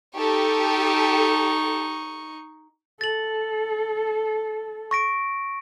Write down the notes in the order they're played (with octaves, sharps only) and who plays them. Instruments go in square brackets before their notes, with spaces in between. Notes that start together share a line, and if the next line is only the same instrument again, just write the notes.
[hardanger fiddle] D#4 C#6 [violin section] G4 A4
[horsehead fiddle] A4 [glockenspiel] A6 F#7
[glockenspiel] C#6 A#6 D7